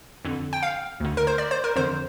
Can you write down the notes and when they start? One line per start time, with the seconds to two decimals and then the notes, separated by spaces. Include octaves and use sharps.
0.25 F2 D3
0.53 G5
0.63 F5
1.00 D2 D3
1.17 A#4
1.27 C5
1.38 D5
1.51 C5
1.64 A#4
1.76 F2 D3 C5